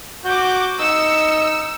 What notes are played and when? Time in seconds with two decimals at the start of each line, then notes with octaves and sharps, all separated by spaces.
0.25 F#4 D6 G6
0.80 D#4 E6 C#7